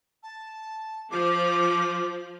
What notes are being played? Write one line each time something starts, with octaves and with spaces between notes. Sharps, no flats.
A5
F3 D6